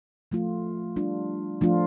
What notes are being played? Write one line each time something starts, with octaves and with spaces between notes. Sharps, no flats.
F3 A3 F4
G3 D4 F4
F3 A3 D4 F4